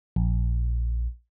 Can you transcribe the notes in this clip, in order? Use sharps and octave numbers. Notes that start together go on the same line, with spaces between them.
A#1